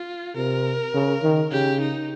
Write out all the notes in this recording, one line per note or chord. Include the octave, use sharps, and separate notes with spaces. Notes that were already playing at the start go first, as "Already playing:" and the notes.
Already playing: F4
C3 A#4
C#3
D#3
C#3 G4
D#4